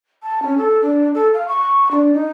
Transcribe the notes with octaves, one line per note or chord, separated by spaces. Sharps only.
A5
C#4
A4
D4
A4
F5
C#6
D4
D#4